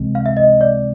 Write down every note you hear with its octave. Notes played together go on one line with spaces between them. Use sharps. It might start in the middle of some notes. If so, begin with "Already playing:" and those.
Already playing: C#2 C3 E3 G#3 C4
F5
E5
D#5
D5